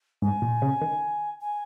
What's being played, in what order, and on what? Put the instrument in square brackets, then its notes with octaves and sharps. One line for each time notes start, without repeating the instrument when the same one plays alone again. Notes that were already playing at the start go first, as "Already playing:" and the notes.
[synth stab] G#2 [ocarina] G#5
[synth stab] A#2
C#3
D#3
[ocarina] G#5